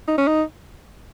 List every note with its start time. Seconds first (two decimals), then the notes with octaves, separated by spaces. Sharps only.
0.08 D#4
0.18 C#4
0.27 D#4